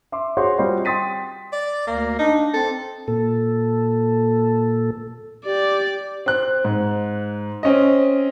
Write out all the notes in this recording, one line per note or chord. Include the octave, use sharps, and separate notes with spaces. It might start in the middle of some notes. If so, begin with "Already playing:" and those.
E5 C6 D6
F#4 G#4 C5 C#5 C6
G3 C4 F4 C5 D#5
G5 C6 D#6 A6 B6 D#7
D5
D2 A#3
D4 D#4
C4 A4
A#2 A4
G4 D5
C4 F#6
G#2
C4 C#4 D#5